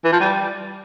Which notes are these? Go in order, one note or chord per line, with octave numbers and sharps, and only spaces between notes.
E3
F3
G3